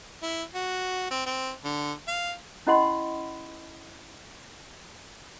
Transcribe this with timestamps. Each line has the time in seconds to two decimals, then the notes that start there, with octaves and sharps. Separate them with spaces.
0.23 E4
0.55 F#4
1.11 C4
1.26 C4
1.65 D3
2.08 F5
2.67 C#4 E4 D#5 F#5 B5 C6